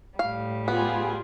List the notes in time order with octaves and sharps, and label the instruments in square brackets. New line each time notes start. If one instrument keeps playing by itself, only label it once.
[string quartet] A2 G3 [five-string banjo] F5
[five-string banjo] B3 [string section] F4 G4 G#4